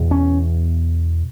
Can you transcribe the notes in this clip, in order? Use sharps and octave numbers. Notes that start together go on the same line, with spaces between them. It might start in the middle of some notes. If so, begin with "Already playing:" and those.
Already playing: E2 B2
C#4